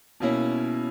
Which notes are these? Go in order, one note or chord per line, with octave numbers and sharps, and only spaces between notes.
B2 A#3 C#4 E4